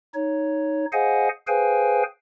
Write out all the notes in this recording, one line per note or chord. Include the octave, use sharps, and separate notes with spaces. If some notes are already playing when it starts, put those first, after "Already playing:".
D#4 C#5
G#4 C5 D#5 F5 F#5 G#5
G#4 B4 C5 F5 G5 G#5